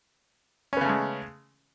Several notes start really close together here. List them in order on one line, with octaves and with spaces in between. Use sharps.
C#4 B3 C#3 A3 G#3